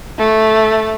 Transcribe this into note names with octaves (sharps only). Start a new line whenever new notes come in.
A3